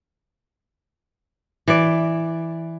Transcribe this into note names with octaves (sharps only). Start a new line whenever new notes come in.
E3 D5